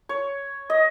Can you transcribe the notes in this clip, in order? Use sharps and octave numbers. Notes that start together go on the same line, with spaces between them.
C#5
D#5